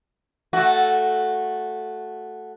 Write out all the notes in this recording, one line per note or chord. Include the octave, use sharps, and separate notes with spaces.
A3 F#4